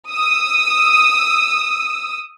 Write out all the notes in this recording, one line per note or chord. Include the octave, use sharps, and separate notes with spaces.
D#6 E6